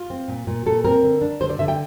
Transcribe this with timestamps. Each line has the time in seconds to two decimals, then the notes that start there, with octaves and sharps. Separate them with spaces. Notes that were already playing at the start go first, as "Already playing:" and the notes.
Already playing: F4
0.10 C4
0.28 A#2
0.47 A#2
0.66 A#2 A4
0.84 C4 A#4
1.03 D3
1.22 D4
1.40 D3 C5
1.50 D5
1.59 D3 E5
1.68 G5